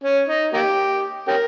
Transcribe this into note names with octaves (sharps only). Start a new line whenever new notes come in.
C#4
D#4
A#3 D#4 G4
C#4 G4 A#4